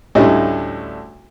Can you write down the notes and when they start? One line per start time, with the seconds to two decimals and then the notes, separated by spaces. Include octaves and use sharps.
0.15 D2 A2 D3 G3 C#4 D#5